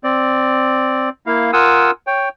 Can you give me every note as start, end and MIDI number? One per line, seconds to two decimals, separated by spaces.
0.04 1.09 60
0.04 1.09 74
1.27 1.51 58
1.27 1.51 64
1.27 1.51 77
1.53 1.91 65
1.53 1.91 70
1.53 1.91 78
1.53 1.91 80
1.53 1.91 87
1.53 1.91 88
2.07 2.29 73
2.07 2.29 79